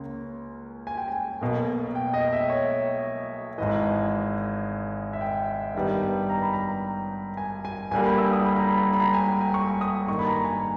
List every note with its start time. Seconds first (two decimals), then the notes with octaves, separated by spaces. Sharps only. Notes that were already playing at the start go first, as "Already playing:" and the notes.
Already playing: C#2 C#3 A#3
0.87 G#5
0.97 G5
1.08 G#5
1.41 B1 B2 A#3
1.95 G5
2.14 D#5
2.25 G5
2.32 E5
2.50 C#5
3.58 G#1 G#2 E3 D#5
5.13 E5
5.21 G5
5.75 G2 D#3 G3 B3
6.29 A#5
6.42 B5
6.53 A#5
7.37 G#5
7.65 G#5
7.91 G1 G2 G3 A#3 G#5
8.06 B5
8.18 E6
8.33 D#6
8.46 B5
8.56 A#5
8.67 B5
8.93 B5
9.00 A#5
9.14 G#5
9.27 G5
9.41 G#5
9.54 C#6
9.81 D#6
10.08 G2 D#3 A#3 C#6
10.19 B5
10.26 A#5
10.44 G#5